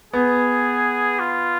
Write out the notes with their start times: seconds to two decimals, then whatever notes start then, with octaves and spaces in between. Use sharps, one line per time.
0.13 B3 G#4
1.20 F4